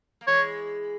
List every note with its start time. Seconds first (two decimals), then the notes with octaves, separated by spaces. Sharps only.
0.21 A#3
0.27 E3 G#3 C#5